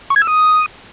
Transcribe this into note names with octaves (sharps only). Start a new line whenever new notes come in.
C#6
G#6
E6
D#6